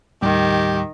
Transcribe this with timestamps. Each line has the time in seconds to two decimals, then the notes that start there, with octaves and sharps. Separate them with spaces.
0.23 D#2 A2 D#3 G3 G4